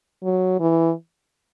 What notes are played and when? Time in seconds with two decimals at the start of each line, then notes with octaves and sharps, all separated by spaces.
0.23 F#3
0.60 E3